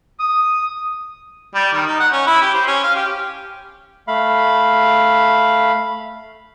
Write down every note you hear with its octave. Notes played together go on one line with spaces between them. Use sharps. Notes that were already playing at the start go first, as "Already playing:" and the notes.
D#6
G3
D#3
D#4
F#5
C#4
E4
G4
C5
C#4
F5
G4
A3 F5 B5